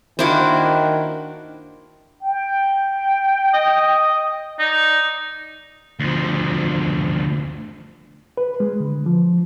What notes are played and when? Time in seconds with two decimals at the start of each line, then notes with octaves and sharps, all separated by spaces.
0.19 D#3 A#3 D4 E4 F#4 C5
2.22 G5
3.54 D#5
4.59 D#4 D5
6.00 D2 F3
8.37 B4
8.60 G#3
8.80 D3
9.06 F3